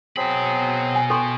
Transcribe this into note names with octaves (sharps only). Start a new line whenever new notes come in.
B2 F#3 C4 G#4 B5
G#5
A4 G5 C6 C#6